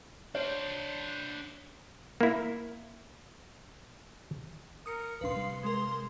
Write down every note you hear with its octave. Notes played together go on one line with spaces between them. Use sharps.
D4 C5 C#5
A#3 E4
A#4 D#6 C#7
D1 A#1 D4 B4 F5 C6
C3 G3
G#3 A#4 C6